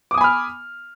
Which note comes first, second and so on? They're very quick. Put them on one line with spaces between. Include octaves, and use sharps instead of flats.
D6 D#6 G#5 B5 F6